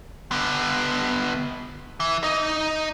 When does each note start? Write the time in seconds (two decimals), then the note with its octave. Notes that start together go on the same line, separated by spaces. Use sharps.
0.32 D3 B3
2.00 E3
2.23 D#4 D#5